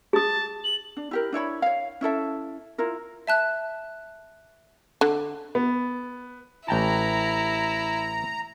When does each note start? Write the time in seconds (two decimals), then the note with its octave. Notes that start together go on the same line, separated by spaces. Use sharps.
0.13 G#4 A5 D#6
0.64 F#7
0.97 D4
1.11 E4 G4 A#4
1.32 D4 E4 C#5 B5
1.62 C#5 F5
2.01 C#4 E4 A4 E5
2.78 E4 F4 A#4
3.27 E5 A5 F#6
5.01 D3
5.55 B3
6.68 A1 E4 G5 A5 A#5